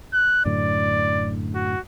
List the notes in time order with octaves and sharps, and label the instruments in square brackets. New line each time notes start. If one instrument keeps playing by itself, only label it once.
[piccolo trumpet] F#6
[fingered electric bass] F#2 A2 D3 [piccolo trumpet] D5
[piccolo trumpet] F#4